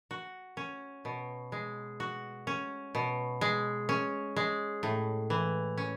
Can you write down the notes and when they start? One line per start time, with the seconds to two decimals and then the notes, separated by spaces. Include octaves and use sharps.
0.11 F#4
0.57 C#4
1.05 B2
1.52 G#3
2.00 F#4
2.47 C#4
2.95 B2
3.41 G#3
3.89 C#4
4.36 G#3
4.83 A2
5.30 E3
5.78 C#4